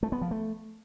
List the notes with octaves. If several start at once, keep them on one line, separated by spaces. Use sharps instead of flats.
A3
B3
F3
A3